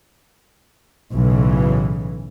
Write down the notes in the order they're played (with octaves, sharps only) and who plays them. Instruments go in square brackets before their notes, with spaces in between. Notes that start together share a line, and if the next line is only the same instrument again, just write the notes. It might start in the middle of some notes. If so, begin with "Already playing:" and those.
[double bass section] B1 A2 C#3 E3